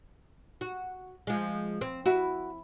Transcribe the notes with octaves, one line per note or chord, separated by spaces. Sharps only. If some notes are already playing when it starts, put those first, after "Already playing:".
F#4
F3 G#3
C4
E4 F#4